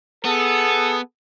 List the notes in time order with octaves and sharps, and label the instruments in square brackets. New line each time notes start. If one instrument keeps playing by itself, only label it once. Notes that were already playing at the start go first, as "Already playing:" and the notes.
[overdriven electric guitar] B3 [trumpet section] G#4 A4